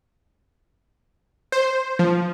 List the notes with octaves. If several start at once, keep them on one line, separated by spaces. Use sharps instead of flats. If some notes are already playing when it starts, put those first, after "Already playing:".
C5
F3